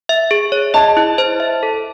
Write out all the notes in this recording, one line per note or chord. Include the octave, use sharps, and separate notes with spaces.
E5
G#4
C#5
D#5 A5
E4
C5
E5
A4